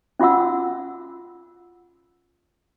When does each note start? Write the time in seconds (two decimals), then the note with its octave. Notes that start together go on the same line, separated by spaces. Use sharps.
0.20 C#4 F4 F#4 F#5 E6